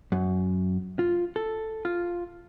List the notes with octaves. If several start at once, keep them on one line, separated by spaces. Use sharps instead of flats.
F#2
F4
A4
F4